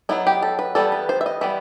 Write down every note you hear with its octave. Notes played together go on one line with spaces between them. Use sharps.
F#3 B3 D#4 E4
G4
A4
B4
E3 G3 B3 A4
B4
C5
E5
D#5
E3 G3 B3 E5